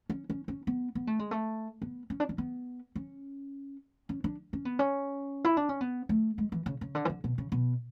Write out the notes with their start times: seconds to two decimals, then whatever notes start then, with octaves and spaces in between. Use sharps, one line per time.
0.10 C#4
0.30 C#4
0.48 C#4
0.67 B3
0.95 B3
1.07 A3
1.19 G#3
1.31 A3
1.82 B3
2.10 C#4
2.20 D4
2.29 C#4
2.38 B3
2.95 C#4
4.09 C#4
4.24 D4
4.53 C#4
4.65 B3
4.79 C#4
5.45 E4
5.57 D4
5.69 C#4
5.81 B3
6.09 A3
6.38 G#3
6.52 E3
6.66 C#3
6.81 C#3
6.95 D3
7.05 E3
7.09 D3
7.24 B2
7.38 C#3
7.52 B2